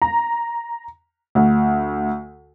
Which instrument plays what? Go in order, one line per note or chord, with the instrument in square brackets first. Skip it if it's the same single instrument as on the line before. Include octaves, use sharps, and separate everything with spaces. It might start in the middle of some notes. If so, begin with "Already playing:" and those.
[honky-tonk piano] A#5
D2